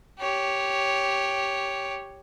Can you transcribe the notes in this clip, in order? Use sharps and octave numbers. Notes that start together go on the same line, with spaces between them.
G4 C#5